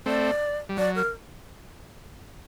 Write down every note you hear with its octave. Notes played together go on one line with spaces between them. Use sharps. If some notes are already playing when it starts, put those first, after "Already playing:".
A3 C4 D5
G3
F#3 D5
A#4